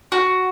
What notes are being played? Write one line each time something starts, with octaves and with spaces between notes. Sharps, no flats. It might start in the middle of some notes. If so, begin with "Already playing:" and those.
F#4